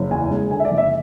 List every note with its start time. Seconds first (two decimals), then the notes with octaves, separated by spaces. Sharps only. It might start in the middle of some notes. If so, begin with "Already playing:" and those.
Already playing: F#1
0.11 E2 G#5
0.31 G#3
0.51 D3 G#5
0.60 E5
0.65 D5
0.71 F#1
0.78 E5